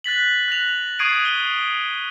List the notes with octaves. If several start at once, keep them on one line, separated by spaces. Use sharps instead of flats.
F#6 A6 B6 F#7
F#6 A#6 F7
C#6 D#6 G#6 C7 D7 D#7
G7